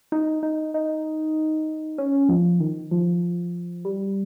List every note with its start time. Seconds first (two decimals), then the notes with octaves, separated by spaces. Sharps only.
0.12 D#4
0.43 D#4
0.74 D#4
1.98 C#4
2.29 F3
2.60 D#3
2.91 F3
3.85 G3